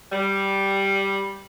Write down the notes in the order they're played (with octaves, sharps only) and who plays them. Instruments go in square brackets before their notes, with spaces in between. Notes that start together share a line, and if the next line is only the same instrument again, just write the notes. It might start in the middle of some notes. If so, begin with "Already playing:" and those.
[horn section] G3